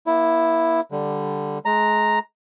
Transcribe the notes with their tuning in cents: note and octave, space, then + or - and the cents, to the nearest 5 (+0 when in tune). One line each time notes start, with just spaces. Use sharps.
A#3 +35 E4 +0
D3 +0 G3 +0
G#3 +30 A#5 +0